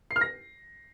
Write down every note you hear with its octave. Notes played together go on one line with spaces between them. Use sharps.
C7
F6
A#6